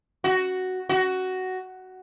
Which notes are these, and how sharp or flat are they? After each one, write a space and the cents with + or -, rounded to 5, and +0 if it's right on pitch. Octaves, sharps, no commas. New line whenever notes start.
F#4 +5
F#4 +10